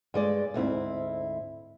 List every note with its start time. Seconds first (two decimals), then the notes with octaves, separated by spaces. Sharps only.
0.14 G2 G#3 D5
0.54 D2 G#2 C4 E4